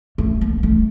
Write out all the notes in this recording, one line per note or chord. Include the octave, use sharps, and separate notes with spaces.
A3
A#3
A3